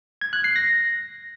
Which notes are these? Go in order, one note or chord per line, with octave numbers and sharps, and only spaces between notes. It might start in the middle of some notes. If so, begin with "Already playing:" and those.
G#6
F#6
C7
A#6